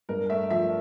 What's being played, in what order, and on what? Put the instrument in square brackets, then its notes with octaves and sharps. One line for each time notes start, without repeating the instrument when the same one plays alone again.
[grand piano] G2 A#4
A3 E5
F3 E5